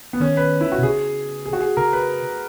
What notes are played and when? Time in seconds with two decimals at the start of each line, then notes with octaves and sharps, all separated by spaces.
0.13 B3
0.20 D#3 C#4
0.37 B4
0.61 E4
0.72 F#4
0.79 B2
0.83 C#3 G#4
1.46 G#4
1.53 F#4
1.61 G#4
1.77 C#3 A#4
1.93 B4